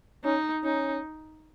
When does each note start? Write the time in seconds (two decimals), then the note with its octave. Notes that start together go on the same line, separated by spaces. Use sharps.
0.24 C#4 D#4
0.63 C#4 D#4